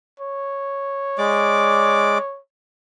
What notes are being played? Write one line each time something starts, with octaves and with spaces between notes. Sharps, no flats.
C#5
G#3 D5 D6